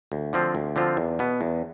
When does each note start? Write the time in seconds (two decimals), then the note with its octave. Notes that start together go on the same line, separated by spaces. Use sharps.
0.12 D2
0.33 D3 F3 C4 F4
0.55 D2
0.76 D3 F3 C4 F4
0.97 E2
1.19 B2 B3
1.41 E2